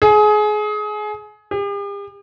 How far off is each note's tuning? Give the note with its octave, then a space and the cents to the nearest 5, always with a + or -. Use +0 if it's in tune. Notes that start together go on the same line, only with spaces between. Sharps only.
G#4 +25
G4 +45